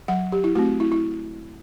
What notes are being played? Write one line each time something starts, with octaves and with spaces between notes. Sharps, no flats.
F#3 F#5
G4
E4
A3 C4 F#4
E4
E4